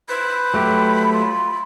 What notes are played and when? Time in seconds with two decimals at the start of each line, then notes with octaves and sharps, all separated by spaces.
0.09 B4 C5 B5
0.54 F#3 A3 G4
1.13 F4